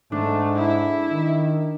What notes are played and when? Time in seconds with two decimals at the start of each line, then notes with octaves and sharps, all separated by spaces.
0.12 G#2 A3 D4
0.55 E4
1.12 D#3